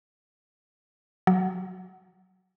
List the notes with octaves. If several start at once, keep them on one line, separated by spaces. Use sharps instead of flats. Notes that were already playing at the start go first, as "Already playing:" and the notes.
F#3